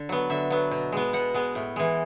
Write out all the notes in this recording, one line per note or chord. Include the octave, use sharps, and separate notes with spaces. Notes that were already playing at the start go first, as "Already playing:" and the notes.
Already playing: D3
F#3 B3
D3 E5
F#3 B3
B2
G#3 B3
B2 F#5
G#3 B3
A2
E3 G#3